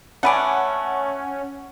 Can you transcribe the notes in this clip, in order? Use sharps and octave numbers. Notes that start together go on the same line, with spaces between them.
A3 C#4 B4 D5 F#5 G#5